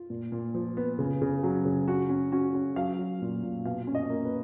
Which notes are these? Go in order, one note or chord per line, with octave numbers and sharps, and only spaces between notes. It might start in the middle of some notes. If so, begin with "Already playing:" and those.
Already playing: F4
A#2
A#2
F3
B3
C#3
C#3
F#3
C#3
C#4 F#4
C#4
C#4 F#4
C#4
F#3 F5
F#3
A#2
A#2
B2 F5
C#4
D#5
A#3
B4